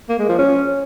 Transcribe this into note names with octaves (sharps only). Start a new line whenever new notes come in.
A#3
G#3
F3
C#4